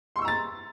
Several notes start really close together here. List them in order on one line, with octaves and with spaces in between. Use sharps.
C6 C#6 E6 A#5 A6